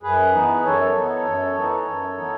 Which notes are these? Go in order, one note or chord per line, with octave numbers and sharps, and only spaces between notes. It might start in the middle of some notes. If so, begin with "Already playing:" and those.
F#2 G#4 B4
E3 B3 D#4
F#2 A4 C#5
E3 B3 D#4
F#2
E3 B3 D#4
F#2
E3 B3 D#4